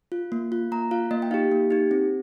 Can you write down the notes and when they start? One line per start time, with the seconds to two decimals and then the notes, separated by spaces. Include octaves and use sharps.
0.12 F4
0.32 A#3
0.52 F4
0.72 A#3 A#5
0.91 F4 F5
1.11 A#3 D#5
1.22 G5
1.31 D#4 G4 F5
1.52 A#3
1.71 D#4 G4
1.91 C4